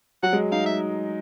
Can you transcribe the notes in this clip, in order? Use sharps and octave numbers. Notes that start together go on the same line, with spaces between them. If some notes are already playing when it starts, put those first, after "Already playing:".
F#3 F#5
G#3
D#4 F5
E5